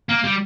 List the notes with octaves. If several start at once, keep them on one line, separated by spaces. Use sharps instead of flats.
A#3
G3